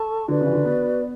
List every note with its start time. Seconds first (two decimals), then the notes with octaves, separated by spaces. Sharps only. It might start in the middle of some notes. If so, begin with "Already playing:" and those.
Already playing: A4 A5 C#6
0.28 D3 F#4 B4 D5
0.41 C#3
0.47 E3
0.53 D3
0.65 B3